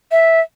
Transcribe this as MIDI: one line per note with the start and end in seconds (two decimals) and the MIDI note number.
0.12 0.40 76